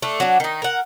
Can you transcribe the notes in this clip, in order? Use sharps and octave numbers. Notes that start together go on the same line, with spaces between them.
A3 D4
F#3 D4
D#3 D#4
A#4 F#5